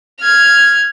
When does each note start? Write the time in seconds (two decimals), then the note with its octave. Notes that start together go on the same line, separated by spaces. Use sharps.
0.20 F6 G#6